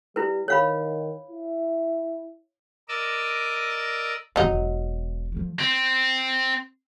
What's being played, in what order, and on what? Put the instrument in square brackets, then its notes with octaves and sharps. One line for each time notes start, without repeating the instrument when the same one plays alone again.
[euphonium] G3 [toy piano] E4 B4
[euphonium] D#3 [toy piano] C#5 F5 B5
[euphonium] E4
[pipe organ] A#4 D5 D#5 D6 E6
[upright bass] G#1 F2 [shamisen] F#3 D#4
[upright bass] E1
F3 A3
[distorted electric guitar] C4